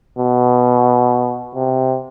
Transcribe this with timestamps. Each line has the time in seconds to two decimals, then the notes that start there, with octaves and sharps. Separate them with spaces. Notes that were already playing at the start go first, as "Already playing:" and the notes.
0.19 B2
1.55 C3